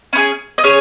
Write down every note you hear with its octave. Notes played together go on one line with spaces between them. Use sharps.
C#4 E4 G#4
D#5
C#4 G#4 C#5